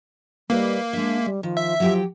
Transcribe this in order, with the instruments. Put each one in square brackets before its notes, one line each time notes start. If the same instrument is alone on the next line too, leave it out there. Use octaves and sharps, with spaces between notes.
[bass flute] G3 [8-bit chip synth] A#3 [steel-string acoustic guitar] E4 B4 D#5
[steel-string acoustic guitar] G#3 E5 [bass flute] D4
[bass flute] G3
[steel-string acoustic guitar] D#3 [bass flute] F3
[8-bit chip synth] E5
[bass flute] F3 [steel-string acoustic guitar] F#3 G4 G5